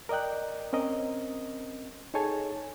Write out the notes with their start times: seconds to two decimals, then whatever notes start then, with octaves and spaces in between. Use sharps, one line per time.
0.09 A#4 D5 D#5 G5 F#6
0.73 C4 C#4 A#4 D#5
2.14 D#4 G#4 A4 C#5 G#5 A5